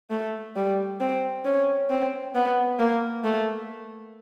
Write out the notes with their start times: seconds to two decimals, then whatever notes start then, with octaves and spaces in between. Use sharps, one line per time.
0.10 A3
0.56 G3
1.00 C4
1.45 C#4
1.90 C4
2.35 B3
2.79 A#3
3.24 A3